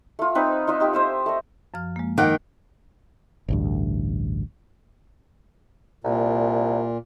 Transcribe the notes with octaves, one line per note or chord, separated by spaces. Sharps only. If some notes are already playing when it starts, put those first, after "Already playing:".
A3 F4
C4 D#4 B4 B5
D#4 F4 D#5 E5
D#4 G4 G5
C5 E5 D#6
A3 D#5
F#2 F3 F6
G#3 A#3
D#3 F#5 G5 D6
A1 D2 G2
C2 A#2